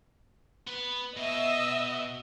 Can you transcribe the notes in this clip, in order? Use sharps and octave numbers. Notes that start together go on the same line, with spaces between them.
B3 B4
B2 D#5 E5 E6